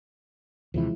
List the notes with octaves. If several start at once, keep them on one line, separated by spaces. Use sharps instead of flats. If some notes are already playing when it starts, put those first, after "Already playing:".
D#2 C3 E3 F3 G#3 E4